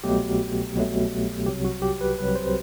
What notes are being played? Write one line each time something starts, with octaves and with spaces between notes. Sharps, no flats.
C2 B2 F#3 A3 G4
C2 B2 F#3 A3
C2 C3 F#3 G4
F#4
G4
B4
C2 C3 F#3 B4
C5